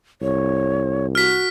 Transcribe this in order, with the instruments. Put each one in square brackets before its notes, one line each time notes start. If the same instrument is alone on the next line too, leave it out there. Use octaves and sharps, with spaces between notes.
[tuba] C2 [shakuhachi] C#5
[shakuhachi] F#4 [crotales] F6 B6